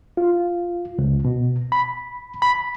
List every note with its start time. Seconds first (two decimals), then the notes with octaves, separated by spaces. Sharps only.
0.17 F4
0.98 C#2
1.25 B2
1.72 B5
2.42 B5